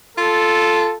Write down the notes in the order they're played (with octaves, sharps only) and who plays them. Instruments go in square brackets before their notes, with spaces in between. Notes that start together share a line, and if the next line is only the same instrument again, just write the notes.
[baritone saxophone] F4 [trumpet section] A4